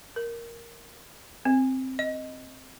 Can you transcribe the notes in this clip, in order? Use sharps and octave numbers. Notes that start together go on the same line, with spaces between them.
A#4
C4
D#5